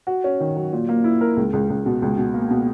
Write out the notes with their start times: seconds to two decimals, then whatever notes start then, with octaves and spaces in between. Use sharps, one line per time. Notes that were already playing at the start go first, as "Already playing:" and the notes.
0.07 F#4
0.24 C#4
0.40 D#3
0.56 F#3
0.73 A#2
0.89 A#3
1.04 E4
1.21 A#4
1.37 C#2
1.53 C#2
1.70 C#2
1.86 B2
2.02 C#2
2.18 B2
2.34 A#3
2.50 B2